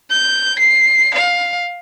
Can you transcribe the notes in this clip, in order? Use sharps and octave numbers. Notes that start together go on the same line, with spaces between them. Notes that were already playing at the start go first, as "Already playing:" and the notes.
G6
C7
F5